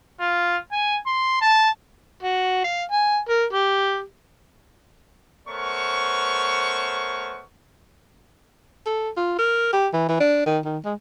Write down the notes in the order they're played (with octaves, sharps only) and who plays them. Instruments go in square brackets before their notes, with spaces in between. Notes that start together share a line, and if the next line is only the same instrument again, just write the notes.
[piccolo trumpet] F4
G#5
C6
A5
[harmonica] F#4
F5
G#5
A#4
G4
[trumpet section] A3 B3 A#4 C5 C#5 C#6
[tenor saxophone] A4
F4
A#4
G4
E3
E3
D4
D#3
D#3
G#3